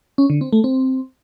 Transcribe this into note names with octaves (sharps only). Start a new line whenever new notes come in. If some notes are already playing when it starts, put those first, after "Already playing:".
C#4
D3
C4
A3
C4